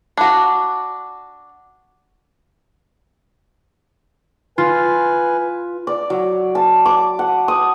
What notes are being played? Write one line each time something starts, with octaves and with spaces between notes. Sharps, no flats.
D4 F#4
F4 B4 G#5
D5
F#3
A5
D6
F#5
D#6